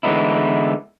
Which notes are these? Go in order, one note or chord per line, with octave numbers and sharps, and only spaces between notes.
D3 E3 G#3 B3 D#4 E4